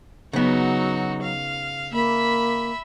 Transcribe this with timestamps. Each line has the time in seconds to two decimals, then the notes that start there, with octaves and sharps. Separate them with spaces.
0.33 C#3 F#3 B3 D#4 F#4
1.22 F5
1.92 A#3 E5 B5